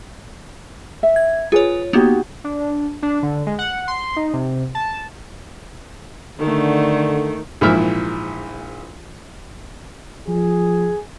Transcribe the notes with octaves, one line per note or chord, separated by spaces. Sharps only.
E5
G#6
F4 G#4 B4 C#5 G#5
A#3 B3 D#4 F#4 G4
D4
D4
D3
G#3
F#5
C6
D#4
C3
A5
D3 D#3 A3
A#1 G#2 E3 E4 E5 F6
F3 G#4